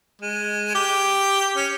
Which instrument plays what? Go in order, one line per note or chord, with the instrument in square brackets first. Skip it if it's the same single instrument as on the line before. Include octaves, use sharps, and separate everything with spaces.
[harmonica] G#3
G4
C#4